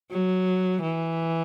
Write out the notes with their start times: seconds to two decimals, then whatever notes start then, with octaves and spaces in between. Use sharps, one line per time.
0.11 F#3
0.82 E3